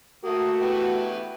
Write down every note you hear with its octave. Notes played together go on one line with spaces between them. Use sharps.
A3 A#3 F#4 D#6
B3 E4 G4